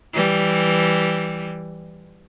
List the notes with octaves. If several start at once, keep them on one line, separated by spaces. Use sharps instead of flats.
E3 G3